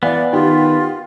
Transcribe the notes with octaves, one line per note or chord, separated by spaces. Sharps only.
E3 B3 D5 F5
D#3 F4 G4